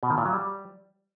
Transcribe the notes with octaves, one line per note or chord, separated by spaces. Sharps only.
B2
D#3
A#2
F#3
G3